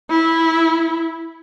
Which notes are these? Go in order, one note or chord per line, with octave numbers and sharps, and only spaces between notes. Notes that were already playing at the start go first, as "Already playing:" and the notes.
E4